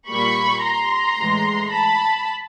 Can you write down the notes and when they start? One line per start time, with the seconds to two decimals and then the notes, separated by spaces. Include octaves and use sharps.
0.09 A#2 G3 A#3 B5 C#6
0.63 A#5 C6
1.17 A2 E3 G#3
1.71 A5 B5